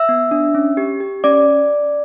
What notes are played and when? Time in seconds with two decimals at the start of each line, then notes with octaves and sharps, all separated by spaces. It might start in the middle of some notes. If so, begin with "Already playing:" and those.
Already playing: E5 E6
0.09 B3
0.31 D4
0.55 C#4
0.77 G4
1.00 G4
1.24 C#4 D5 D6